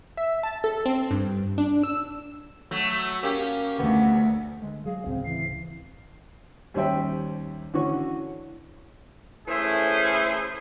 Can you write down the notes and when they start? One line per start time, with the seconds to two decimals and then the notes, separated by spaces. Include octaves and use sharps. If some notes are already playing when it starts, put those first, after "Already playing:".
0.17 E5
0.43 A5
0.64 A4
0.85 C4
1.11 G2
1.58 D4
1.84 E6
2.71 F#3 A3
3.23 A#3 C#4 G4
3.79 D2 B3
4.62 D3 G#3
4.85 F#3 G#4 F5
5.06 D2 A2 C#3 C4
5.24 E3 C7
6.74 D#2 G3 C#4 C5 E5 G5
7.74 D3 E3 C#4 F#4 C#6
9.48 E3 A3 C#4 E4 G#4 C5